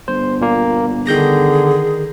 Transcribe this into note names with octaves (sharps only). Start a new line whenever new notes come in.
G1 C5
A#2 A#3
D3 D#3 G#4 G6 A#6